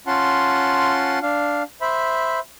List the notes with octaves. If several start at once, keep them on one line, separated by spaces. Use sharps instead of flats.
C#4 F4 F#5 A5 C6
D4 F5
C5 E5 B5